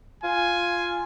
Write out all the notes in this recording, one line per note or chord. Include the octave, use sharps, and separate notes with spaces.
F4 G#5